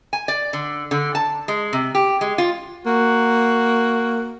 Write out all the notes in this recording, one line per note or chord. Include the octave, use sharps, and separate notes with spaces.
G#5
D5
D3
D3
A5
G#3
C3
G4
G#3
F4
A#3 F#4